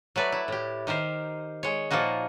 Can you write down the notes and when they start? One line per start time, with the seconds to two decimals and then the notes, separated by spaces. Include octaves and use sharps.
0.16 F#3 A3 B4 D5
0.32 E4
0.48 A2 G4
0.87 D#3 G4 A#4 C5
1.63 G#3 C#5
1.91 A#2 F3 A#3 D#4 F#4